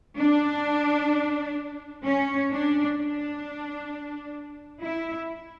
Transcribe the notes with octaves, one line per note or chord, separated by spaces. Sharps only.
D4
C#4
D4
D4
E4